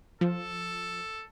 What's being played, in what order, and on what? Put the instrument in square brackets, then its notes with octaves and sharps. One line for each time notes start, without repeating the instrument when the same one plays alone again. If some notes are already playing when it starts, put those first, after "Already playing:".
[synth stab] F3 [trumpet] A4